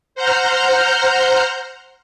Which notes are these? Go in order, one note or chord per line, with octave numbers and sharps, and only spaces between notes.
C5 F#5 A#5 F6 G6